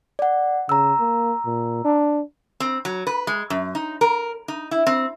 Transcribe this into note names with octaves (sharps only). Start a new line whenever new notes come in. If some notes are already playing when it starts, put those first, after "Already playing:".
D5 F#5
C#3 A#5 E6
A#3
A#2
D4
C4
F#3
B4
G#3
F#2
D#4
A#4
D#4
E4
C4